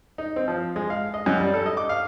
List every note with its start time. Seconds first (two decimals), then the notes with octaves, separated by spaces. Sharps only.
0.18 D#4
0.36 C4
0.48 F3
0.76 G#3
0.90 F5
1.14 D#5
1.26 F#2
1.40 G3
1.54 A4
1.66 D#5
1.77 D6
1.89 F5